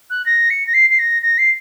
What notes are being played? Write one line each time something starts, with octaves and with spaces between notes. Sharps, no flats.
F#6
A#6
C#7
A#6
C7
C7
A#6
A#6
C7